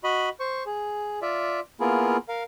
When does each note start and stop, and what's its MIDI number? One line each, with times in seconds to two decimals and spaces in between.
0.04 0.29 66
0.04 0.29 75
0.04 0.29 83
0.40 0.64 72
0.40 0.64 85
0.66 1.19 68
1.22 1.60 65
1.22 1.60 74
1.22 1.60 76
1.80 2.17 58
1.80 2.17 59
1.80 2.17 64
1.80 2.17 65
1.80 2.17 68
1.80 2.17 70
2.29 2.43 70
2.29 2.43 77